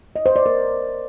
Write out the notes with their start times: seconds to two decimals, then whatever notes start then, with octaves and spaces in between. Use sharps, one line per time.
0.16 D#5
0.26 C5
0.36 D5
0.46 A#4